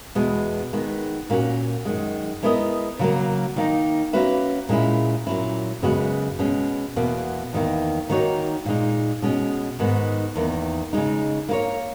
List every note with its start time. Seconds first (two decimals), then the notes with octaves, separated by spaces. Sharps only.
0.15 E2 B2 G#3
0.73 D#3 G#3 B3
1.30 A#2 A#3 C#4 F#4
1.85 F#2 D#3 G#3
2.43 G#3 B3 E4 A#4 D#5
2.99 C#3 F#3 A#3
3.56 D#3 A#3 D#4
4.13 A#3 C#4 F#4 B4 E5
4.69 A#2 G#3 C#4 E4
5.27 A#2 F#3 C#4 E4
5.82 F#2 C#3 G#3 B3 F#4
6.39 B2 G#3 C#4
6.96 E2 B2 A#3
7.53 E2 D#3 A#3
8.10 D#3 A#3 D#4 F#4 C#5
8.66 A#2 G#3 D#4
9.22 B2 G#3 C#4
9.79 G#2 D#3 G#3 B3
10.35 E2 D#3 A#3
10.93 C#3 G#3 D#4
11.49 A#3 E4 A#4 C#5